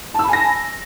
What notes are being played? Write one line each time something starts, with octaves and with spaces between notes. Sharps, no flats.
G#5 A5 B5 E6 A#6